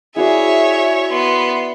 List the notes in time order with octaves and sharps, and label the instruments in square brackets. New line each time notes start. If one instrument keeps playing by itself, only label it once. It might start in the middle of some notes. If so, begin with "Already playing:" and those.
[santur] E4 F#4 D5 [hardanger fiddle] G#4 [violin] C#5 E5
[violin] B3 [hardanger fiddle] C6